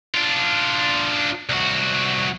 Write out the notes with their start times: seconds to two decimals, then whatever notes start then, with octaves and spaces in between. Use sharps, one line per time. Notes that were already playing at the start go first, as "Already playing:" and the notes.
0.15 D4 F4
1.49 C2 F#4